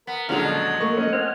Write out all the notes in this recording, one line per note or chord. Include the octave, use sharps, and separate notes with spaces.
B3 A#4
C#2 A#2 D3 F3 F#3 F6
D#5 A5
A3 A#3 C#6
C#4 D#5
C4 D#5 F#5 G#5 F6